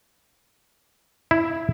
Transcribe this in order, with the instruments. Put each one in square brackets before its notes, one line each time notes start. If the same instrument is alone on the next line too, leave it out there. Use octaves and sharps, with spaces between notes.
[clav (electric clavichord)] E4